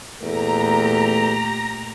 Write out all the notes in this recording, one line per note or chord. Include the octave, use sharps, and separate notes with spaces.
E2 A#2 A3 G4 A4 A#5